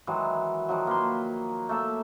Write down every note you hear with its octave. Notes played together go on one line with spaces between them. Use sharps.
D#3 E3 F#3 G#3
D#3 F3 F#3
A#3 B4 C6
A3 A#3 A4 E5